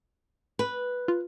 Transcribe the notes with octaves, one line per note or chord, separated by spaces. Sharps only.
B4
F4